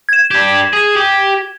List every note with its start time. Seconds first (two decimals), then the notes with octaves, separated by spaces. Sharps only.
0.09 G#6 E7
0.31 D4 G4
0.73 G#4
0.96 G4